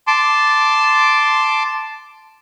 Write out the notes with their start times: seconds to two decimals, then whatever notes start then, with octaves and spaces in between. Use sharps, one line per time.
0.07 A5 C6 D6